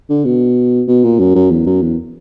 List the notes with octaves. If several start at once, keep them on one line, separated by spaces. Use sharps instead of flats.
D3
B2
B2
A#2
F#2
F#2
E2
F#2
E2